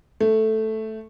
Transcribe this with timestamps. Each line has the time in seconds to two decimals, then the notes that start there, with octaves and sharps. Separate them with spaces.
0.20 A3